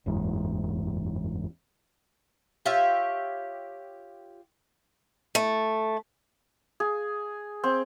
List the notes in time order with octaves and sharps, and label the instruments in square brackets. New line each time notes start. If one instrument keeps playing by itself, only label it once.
[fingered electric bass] F#1 E2 G#2
[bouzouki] F4 G4 C#5 E5
[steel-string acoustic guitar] A3
[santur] G#4
C4